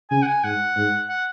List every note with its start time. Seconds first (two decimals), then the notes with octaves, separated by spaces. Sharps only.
0.10 C#3 G#5
0.22 F#5
0.27 G#5
0.44 G#2 F#5
0.77 G#2
1.10 F#5